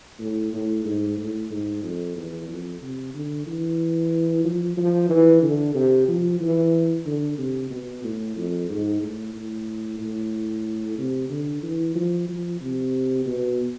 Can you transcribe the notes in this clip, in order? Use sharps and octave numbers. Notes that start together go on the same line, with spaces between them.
A2
A2
G#2
A2
G#2
F2
E2
F2
C3
D3
E3
F3
F3
E3
D3
C3
F3
E3
D3
C3
B2
A2
F2
G#2
A2
A2
A2
C3
D3
E3
F3
F3
C3
B2